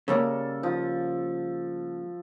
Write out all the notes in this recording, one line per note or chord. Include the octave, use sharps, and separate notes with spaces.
C#3 G3 A#3 A4
F3